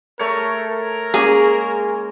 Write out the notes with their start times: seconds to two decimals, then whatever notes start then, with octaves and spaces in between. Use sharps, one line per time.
0.19 A3 A4 A#4 C#5
0.72 A#4
1.14 G#3 A#3 C#4 G#4